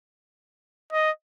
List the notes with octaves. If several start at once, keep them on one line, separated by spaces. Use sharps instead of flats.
D#5